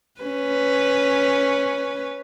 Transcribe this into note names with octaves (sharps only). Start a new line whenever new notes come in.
C#4 B4